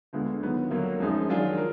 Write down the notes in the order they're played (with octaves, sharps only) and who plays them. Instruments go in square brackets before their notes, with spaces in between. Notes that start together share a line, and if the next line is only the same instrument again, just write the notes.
[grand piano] D2 D3 G#3 B3 F4
D#3 F#3 B3
D2 D3 F#3 A#3
F#2 F3 G#3 D#4 G#4
D#3 F#3 D4 F4 G#4
A#4